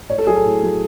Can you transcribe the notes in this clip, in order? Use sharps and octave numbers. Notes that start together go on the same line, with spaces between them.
A2 C#5
A4
F#3 G#4
A4
A2
F#3